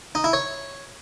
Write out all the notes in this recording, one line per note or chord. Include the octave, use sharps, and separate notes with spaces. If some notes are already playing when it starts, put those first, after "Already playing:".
D#4
E4
C#5